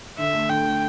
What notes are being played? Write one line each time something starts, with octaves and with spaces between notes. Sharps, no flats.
D3 E5
A3
D3 G5
A3